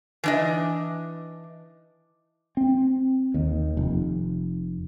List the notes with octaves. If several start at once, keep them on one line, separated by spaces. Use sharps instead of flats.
E3 D4 D#5
C4
D#2
F1